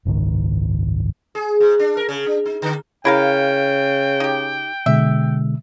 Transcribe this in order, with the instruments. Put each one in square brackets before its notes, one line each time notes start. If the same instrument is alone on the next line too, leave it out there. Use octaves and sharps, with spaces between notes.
[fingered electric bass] F#1 C#2 G#2 D#3
[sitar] G#4
G#2
D4
A#4
C#3
D4
D#4
D3
[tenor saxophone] C#3 [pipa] E4 A#4 F5 [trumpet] G5
[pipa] D#4 G4
[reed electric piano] B2 D3 G#3 [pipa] E5